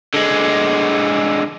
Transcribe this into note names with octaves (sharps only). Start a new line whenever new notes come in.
D3 G#3